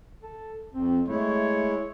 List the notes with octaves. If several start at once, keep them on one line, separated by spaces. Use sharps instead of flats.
A4
F2 C4
G#3 A3 E4 C#5